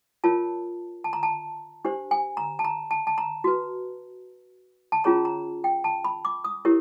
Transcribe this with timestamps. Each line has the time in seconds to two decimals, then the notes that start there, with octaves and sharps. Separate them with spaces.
0.24 F4 A#4 C#5 A5
1.04 A5
1.13 A#5
1.23 A5
1.85 D4 G4 C5
2.11 G#5
2.37 A#5
2.59 A5
2.65 A#5
2.91 A5
3.07 A5
3.18 A#5
3.44 F#4 B4
4.92 A5
5.04 C#4 F4 G#4 C#5 A#5
5.25 A#5
5.64 G5
5.84 A5
6.05 B5
6.25 D6
6.44 D#6
6.65 E4 G4 A#4 C#5